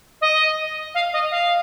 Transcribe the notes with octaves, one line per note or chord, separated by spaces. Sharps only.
D#5
F5
D#5
F5